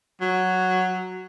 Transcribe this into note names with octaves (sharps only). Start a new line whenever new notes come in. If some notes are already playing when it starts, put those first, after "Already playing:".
F#3